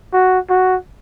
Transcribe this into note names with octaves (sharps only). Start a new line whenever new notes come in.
F#4
F#4